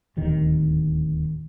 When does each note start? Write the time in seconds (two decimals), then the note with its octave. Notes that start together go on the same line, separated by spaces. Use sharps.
0.16 D1 D#2 D#3